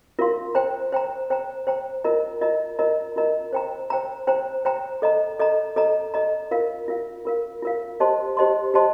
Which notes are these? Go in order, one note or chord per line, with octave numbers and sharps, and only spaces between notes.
F4 A#4 F5 C6
C5 G5 A#5
C5 G5 A#5
C5 G5 A#5
C5 G5 A#5
F4 A#4 D#5 A#5
F4 A#4 D#5 A#5
F4 A#4 D#5 A#5
F4 A#4 D#5 A#5
C5 G5 A#5
C5 G5 A#5
C5 G5 A#5
C5 G5 A#5
A4 D#5 A#5
A4 D#5 A#5
A4 D#5 A#5
A4 D#5 A#5
F4 A#4 F5
F4 A#4 F5
F4 A#4 F5
F4 A#4 F5
G4 C5 D#5 A5 C6
G4 C5 D#5 A5 C6
G4 C5 D#5 A5 C6